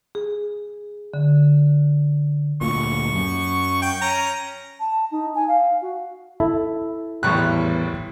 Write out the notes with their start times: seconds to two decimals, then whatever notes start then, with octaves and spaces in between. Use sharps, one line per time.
0.15 G#4
1.14 D3
2.61 D2 A#2 C#6
3.13 F#2
3.82 G5
4.01 C#4 A#5
4.80 A5
5.12 D#4
5.35 G#5
5.48 F5
5.82 F#4
6.40 E4 A4 E5
7.23 G#1 E2 A2 G3 C#6 F#6